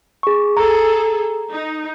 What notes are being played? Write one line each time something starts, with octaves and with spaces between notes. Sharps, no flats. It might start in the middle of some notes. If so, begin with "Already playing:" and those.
G#4 C#6
G#4 A4 A#5
D#4